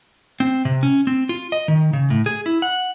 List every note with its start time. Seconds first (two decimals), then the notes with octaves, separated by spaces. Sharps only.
0.40 C4
0.65 C3
0.83 C#4
1.07 C4
1.29 F4
1.52 D#5
1.68 D#3
1.93 C#3
2.10 A2
2.26 G#4
2.46 E4
2.62 F#5